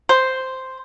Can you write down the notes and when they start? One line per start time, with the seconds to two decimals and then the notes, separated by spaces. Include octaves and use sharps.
0.09 C5